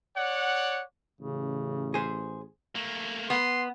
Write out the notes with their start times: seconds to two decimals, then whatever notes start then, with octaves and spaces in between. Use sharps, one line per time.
0.16 C#5 D5 F#5
1.21 A1 C#3
1.94 G#4 C5
2.75 A3 A#3
3.30 B3 C6